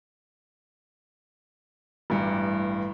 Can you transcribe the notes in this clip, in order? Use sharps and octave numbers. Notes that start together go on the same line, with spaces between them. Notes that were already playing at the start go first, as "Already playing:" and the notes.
A1 G2